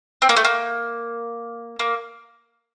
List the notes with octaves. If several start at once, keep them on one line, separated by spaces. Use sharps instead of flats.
C4
A#3
A3
A#3
A#3